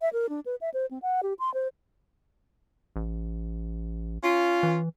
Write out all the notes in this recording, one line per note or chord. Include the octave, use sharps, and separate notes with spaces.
E5
A#4
D4
B4
E5
C5
C4
F#5
G4
C6
C5
A1
C#4 F4
E3